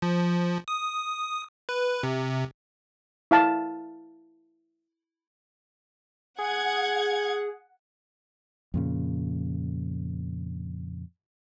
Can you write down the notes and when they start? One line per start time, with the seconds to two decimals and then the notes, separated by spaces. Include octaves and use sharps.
0.02 F3
0.68 D#6
1.69 B4
2.03 C3
3.31 E4 F5 A5
6.39 G#4 F#5 G#6
8.74 F2 A#2 C#3